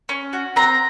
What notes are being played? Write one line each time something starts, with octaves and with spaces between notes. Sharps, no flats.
C#4
F#4
C4 A#5